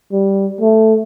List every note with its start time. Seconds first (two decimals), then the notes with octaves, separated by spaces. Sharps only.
0.12 G3
0.61 A3